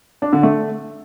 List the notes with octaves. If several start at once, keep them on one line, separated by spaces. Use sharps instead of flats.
D4
D3
A3